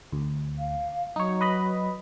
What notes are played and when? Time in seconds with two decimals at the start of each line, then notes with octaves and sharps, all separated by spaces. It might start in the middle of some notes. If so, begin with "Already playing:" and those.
0.12 D2
0.59 F5
1.16 F#3 D#4 C#5
1.41 B4 D#5 B5